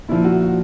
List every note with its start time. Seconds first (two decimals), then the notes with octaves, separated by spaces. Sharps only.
0.09 A#2 F3 E4
0.24 F#4
0.40 F#4